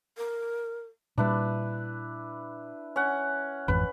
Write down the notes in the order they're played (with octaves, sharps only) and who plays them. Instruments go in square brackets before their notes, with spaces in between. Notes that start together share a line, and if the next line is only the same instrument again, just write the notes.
[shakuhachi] A#4
[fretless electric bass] A#2 G3 [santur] D4 E4 B4
[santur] C#4 F#5
[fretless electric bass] G#1 F2 E3 [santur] B4